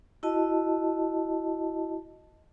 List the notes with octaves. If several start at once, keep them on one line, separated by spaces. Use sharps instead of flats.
E4 F#4 D#5 A5